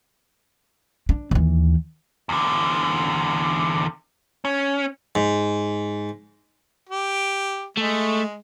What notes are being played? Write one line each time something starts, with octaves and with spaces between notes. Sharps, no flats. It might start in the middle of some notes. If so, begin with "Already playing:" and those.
D4
D#2 E3
E2 D3
C#4
G#2
G4
G#3 A3